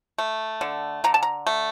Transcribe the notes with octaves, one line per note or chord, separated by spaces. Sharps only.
A3
D3
D3 A#5
A5
A#5
A3